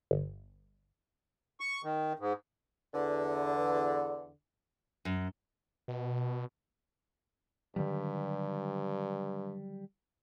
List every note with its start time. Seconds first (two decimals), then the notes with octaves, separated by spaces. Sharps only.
0.11 G1
1.60 C#6
1.84 D#3
2.19 G#2
2.93 E2 D3
5.05 F#2
5.88 B2
7.76 G2 D3 D#3 F#3 G3